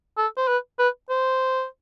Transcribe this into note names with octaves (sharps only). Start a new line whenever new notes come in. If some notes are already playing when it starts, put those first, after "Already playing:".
A4
C5
B4
B4
C5